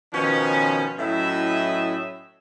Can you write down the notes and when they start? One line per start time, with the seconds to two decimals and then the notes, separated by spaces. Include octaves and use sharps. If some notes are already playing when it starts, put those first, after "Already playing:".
0.13 B2 D#3 F3 C#4
0.99 A2 F#3 C#4 E4 D#5 E5